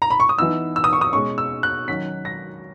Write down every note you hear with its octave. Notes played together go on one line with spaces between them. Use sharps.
A#5
B5
C#6
D#6
E3 B3 D#4 E6
E6
D#6
C#6
D#6
B2 G#3 C#4 C#6
E6
F#6
D#3 F#3 C#4 B6
A#6